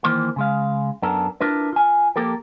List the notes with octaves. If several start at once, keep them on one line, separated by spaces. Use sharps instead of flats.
D#3 E3 A#3 C5 C6
C#3 G#3 F5
F#2 B3 D4 A4 A#4
D4 E4 F4 A#4 B4
F4 G#5
F3 A#3 G4 A4 A#4